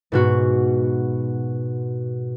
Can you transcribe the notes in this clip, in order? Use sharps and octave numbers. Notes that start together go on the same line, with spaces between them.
G#2 B2 F#4